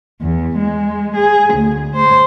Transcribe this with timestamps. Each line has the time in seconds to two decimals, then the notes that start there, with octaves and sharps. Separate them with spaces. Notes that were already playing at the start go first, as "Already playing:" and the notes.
0.21 E2
0.57 G#3
1.16 G#4
1.54 D2
1.96 C5